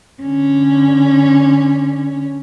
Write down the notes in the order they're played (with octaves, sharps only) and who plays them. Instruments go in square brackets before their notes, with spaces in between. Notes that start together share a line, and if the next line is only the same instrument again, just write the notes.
[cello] D3 C#4